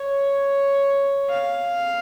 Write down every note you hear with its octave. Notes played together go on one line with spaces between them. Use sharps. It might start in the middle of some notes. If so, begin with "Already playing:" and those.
Already playing: C#5
F5